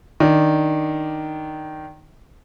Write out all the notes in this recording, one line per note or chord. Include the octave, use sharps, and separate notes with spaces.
D#3 D4